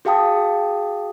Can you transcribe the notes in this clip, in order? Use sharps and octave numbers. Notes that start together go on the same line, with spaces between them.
F#4 G#4 F5 G5 A5 D#6